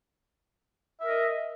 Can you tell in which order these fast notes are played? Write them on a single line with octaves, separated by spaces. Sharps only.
E5 A#4 D#5